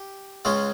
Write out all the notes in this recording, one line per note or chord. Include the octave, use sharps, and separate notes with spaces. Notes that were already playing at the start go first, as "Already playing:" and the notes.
Already playing: G4
C#2 C#3 G#3 C#4 F4